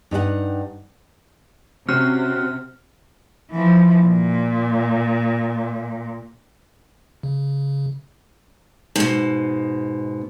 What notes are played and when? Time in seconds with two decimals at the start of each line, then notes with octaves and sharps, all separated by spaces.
0.11 G2 D#4 A4 F#5
1.89 C3 C#4 F#4 C5 F6
3.51 E3 F3
4.05 A#2
7.23 C#3
8.96 G#2 B2